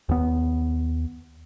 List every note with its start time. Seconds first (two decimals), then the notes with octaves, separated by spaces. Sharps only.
0.09 D#2 B3